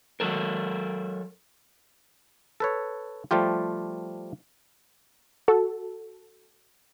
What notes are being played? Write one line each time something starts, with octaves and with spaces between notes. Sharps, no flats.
F#3 A4 A#4
A4 B4 C#5
F3 G3 A3 F4 G4
F#4 A4